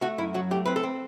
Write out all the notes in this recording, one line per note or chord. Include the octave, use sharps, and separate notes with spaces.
A3 F#4
F#2 E4
F#3 F#4
A3 G4
C4 B4
A4
C4